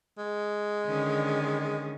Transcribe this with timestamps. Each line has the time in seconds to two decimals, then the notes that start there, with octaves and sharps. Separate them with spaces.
0.18 G#3
0.87 D3 D#3 C#4